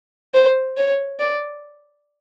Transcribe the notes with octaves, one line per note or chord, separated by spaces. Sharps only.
C5
C#5
D5